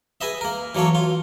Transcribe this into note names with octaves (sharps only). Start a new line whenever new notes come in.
G#4 B4 D#5 E5
A#3 A#4
E3 F#3 A#3 A4 C#5
F4